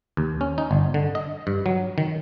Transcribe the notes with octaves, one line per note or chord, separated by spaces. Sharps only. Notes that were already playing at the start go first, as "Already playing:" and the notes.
D#2
C#4
D#4
G1
D3
D#5
G2
F#3
D#3